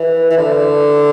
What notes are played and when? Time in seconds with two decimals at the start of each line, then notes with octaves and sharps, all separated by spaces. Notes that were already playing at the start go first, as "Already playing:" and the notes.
Already playing: E3
0.31 E3
0.37 D3